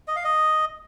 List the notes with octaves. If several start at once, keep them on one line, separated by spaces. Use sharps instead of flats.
D#5
F5
D#5